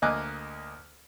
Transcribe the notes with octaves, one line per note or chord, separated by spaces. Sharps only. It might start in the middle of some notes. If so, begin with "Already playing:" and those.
D2 A#3 D#5 G#5 D6 F#6